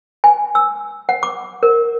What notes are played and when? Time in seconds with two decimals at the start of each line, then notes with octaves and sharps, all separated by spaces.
0.24 G#5
0.55 E6
1.09 F#5
1.23 D6
1.63 A#4